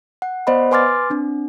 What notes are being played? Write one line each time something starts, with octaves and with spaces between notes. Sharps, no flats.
F#5
B3 C5 D5 D#5 F#5 B5
B4 G#5 C6 D6 F6 A6
C4 D4